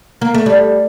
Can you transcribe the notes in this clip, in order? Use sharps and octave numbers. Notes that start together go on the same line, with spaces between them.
A#3
A3
G3